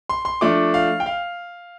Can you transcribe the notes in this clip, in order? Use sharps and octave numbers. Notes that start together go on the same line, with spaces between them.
C6
C6
F3 A3 D4 D6
F5
G5
F5